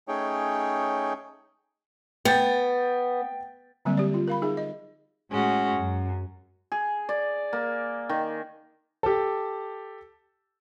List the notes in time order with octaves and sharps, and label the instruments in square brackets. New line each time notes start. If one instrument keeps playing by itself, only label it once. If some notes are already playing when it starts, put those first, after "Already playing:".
[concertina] A3 C#4 D#4 G#4 C#5 G5
[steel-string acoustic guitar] B3 [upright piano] G5 G6 A6
[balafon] D3 F#3 G3 A#3 C4 E5
G4 D5
F4
A#4 F5 B5
D#4 G#4 E5
D#5
[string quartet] A2 G#3 C#4 F#4
F#2
[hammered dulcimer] G#4
D5
A#3
D#3
[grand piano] G4 A4